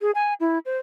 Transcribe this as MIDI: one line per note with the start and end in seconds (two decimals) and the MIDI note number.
0.01 0.11 68
0.15 0.34 80
0.40 0.58 64
0.66 0.77 72